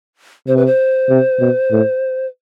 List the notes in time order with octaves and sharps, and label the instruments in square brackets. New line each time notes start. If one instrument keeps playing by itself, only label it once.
[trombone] C3 [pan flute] C5
[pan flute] B4
C5
[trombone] C3
B2
A2